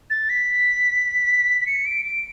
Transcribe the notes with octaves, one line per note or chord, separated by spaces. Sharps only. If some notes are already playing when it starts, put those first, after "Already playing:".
A6
B6
B6
C#7
D7
D7